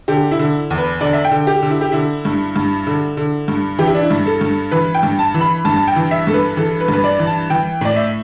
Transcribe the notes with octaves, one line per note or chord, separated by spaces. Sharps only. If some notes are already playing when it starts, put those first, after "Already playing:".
D3 G4
E4
D3
E2
B4
D3 D5
E5
G5
D3
G4
D3
E4
G4
D3 E4
G2
G2
D3
D3
G2
E3 G4
E4
D4
E4
G2
A4
G2
E3 B4
G5
G2
A5
E3
B5
G2 A5
A5
G5
E3
E5
G2 A4
B4
E3 A4
B4
G2
B4
D5
E3
A5
E3 G5
A2 D5
E5